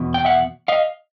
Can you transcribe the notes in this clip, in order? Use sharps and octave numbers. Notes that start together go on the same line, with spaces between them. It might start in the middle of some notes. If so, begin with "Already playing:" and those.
Already playing: E2 B2
G5
E5 F#5
D#5 F5